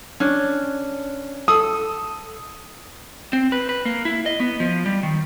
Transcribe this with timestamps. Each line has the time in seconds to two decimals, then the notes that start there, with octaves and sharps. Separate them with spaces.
0.20 C#4 D4
1.48 A4 D#6
3.33 C4
3.52 B4
3.69 B4
3.86 A#3
4.05 E4
4.26 D#5
4.40 B3
4.60 F3
4.86 G3
5.03 D#3